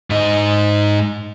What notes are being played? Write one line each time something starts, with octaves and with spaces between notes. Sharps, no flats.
G#2 D#4